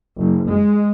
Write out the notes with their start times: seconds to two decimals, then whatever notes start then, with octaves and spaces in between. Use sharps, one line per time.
0.19 F#1
0.50 G#3